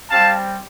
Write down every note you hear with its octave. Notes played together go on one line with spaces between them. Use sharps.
G3 C4 G4 F5 A5